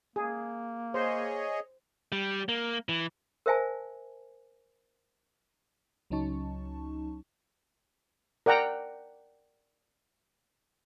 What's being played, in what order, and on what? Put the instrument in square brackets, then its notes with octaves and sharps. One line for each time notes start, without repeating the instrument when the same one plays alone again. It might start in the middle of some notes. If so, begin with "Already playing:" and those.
[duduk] A#3 [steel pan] G#4
[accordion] G#4 C#5 D#5 [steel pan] C5
[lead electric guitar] G3
A#3
E3
[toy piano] A#4 C5 E5 G#5 A5
[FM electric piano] C#2 F#3 C#4 D#4 A5 C#6
[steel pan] A#4 D5 F#5 G5 A#5